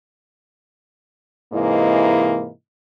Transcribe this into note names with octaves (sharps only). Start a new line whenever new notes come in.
G#2 C3 E3 A#3 E4 D#5